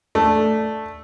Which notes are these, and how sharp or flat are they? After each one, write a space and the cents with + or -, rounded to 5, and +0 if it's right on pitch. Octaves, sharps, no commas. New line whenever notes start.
A3 +0 D4 +0